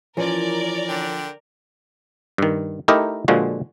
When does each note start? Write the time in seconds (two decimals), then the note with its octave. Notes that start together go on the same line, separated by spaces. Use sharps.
0.17 E3 F3 C#4 A#4 D5
0.89 D3 G5
2.38 G2 D#3
2.88 A3 D#4 E4 G4 A#4 D#5
3.28 A#2 D3 F3 G#3 F#4